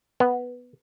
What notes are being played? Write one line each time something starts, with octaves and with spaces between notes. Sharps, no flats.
B3